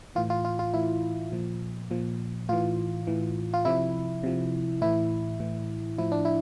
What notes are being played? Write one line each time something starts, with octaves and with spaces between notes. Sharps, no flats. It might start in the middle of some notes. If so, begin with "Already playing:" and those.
A2 E3 F4
F4
F4
F4
A2 E3 E4
A#2 F3
A#2 F3
A2 E3 F4
A2 E3
F4
C3 F3 E4
C3 F3
A2 E3 E4
A2 E3
A2 F3 E4
D4
E4